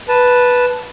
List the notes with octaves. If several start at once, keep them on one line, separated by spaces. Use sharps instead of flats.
B4 A5